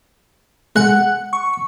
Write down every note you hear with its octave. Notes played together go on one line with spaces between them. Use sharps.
G#3 F#5 F#6
C#6